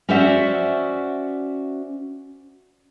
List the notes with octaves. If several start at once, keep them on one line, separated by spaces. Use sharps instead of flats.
C#4 F#4 C5 D5 E5 F#5